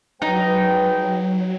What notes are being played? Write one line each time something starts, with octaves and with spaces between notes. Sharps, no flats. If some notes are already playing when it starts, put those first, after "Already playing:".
F#3 G#3 D#4 B4 G5